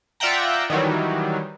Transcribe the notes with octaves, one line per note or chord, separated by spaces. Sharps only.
F4 D5 E5 F#5 G5 A#5
D#3 E3 F#3 G3